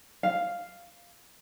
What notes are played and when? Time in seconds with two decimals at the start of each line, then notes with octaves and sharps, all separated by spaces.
0.23 F5